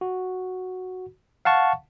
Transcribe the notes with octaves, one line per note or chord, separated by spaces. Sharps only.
F#4
F5 F#5 A5 C#6